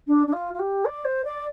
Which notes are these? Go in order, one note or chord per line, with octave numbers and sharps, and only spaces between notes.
D4
D4
F4
F4
G4
D5
C5
D5